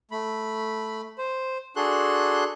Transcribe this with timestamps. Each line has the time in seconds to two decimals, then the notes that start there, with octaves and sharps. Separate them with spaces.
0.11 A3 B5
1.18 C5
1.76 D4 F#4 G#4 A4 C6 F#6